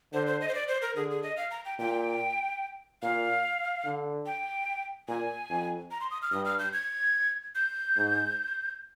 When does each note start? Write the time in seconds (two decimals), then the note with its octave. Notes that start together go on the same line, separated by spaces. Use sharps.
0.13 D3 C5
0.27 C5
0.41 D#5
0.48 C5
0.55 D5
0.68 C5
0.82 A#4
0.96 D3 G#4
1.10 G#4
1.23 D#5
1.37 F5
1.51 A#5
1.65 G5
1.79 A#2 G5
3.02 A#2 F5
3.85 D3
4.26 G5
5.08 A#2 G#5
5.49 F2
5.91 A#5
6.01 C6
6.11 D#6
6.22 F6
6.32 G2 D#6
6.45 F6
6.59 G6
6.73 G#6
7.55 G6
7.97 G#2